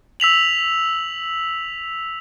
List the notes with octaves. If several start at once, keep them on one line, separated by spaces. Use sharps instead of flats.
E6 B6 F7 F#7